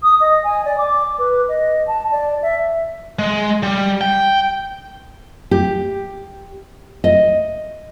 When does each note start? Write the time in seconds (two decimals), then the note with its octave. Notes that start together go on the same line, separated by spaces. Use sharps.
0.03 D#6
0.20 D#5
0.44 G#5
0.65 D5
0.78 D6
1.19 B4
1.48 D#5
1.87 A5
2.12 D5
2.42 E5
3.19 G#3
3.63 G3
4.01 G5
5.51 G4
7.04 D#5